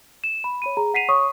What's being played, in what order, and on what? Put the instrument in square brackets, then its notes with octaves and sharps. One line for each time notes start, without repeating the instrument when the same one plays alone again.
[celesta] E7
B5
C#5 B5 D#7
G#4 A#5
F#5 B6 C7 D#7 F7
C#5 C#6 D#6